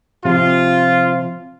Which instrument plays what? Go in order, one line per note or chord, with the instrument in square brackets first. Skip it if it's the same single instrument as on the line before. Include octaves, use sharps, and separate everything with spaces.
[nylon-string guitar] C3 F3 C4 G4 C5 [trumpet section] F4